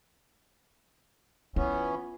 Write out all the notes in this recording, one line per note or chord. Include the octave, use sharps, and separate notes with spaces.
E3 B3 C#4 F4